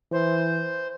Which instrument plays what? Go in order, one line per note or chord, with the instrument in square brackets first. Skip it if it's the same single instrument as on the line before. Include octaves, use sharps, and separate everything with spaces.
[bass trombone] E3 [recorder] C5